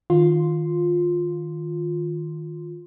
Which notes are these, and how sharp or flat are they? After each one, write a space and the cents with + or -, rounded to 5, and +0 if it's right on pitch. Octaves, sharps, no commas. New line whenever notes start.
D#3 +0 F4 +10 C6 +0